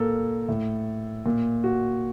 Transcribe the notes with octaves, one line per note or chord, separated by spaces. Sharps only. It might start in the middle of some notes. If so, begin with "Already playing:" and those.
Already playing: A#2 A4 A#4
A2
A#2
F#4